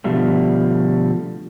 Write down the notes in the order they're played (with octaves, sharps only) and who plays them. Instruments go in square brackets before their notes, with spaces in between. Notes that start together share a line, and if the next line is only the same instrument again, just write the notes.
[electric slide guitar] B2 D3 F3 G3 A3